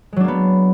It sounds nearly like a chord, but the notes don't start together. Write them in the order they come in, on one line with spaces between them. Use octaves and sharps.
G#3 F#3 D4 A#3 B3